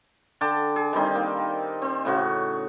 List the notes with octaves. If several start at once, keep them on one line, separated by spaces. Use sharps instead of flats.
D3 G5 A5 D6
G#4
D#3 G3 C4 D#4
A#3
C4 C5
A2 C#3 F#4